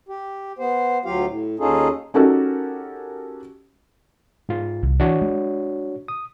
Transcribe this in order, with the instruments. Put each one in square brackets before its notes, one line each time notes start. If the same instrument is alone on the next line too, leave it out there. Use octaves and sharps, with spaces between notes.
[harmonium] G4
B3 C5
D2 F#3 F4 G4 F5
A2
D#2 C#4 D#4 F4 G#4 A4
[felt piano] C#4 D#4 F#4 G4 A4 A#4
[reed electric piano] G#2 F4
[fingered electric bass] C2
[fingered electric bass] E3 [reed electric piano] D4 F#4 C#5
[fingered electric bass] G#3
[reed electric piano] D#6